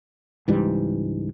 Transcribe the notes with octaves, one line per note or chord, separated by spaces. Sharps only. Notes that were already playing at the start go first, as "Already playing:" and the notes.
C#2 G#2 E3 G3